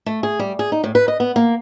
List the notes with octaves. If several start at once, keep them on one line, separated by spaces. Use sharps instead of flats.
A3
G#4
G3
G#4
D#4
A2
B4
D#5
B3
A#3